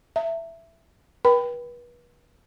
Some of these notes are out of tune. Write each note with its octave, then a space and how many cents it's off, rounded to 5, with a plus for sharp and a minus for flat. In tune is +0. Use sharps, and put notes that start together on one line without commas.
E5 +10 A#5 -45
B4 -35 G5 +0 B5 +25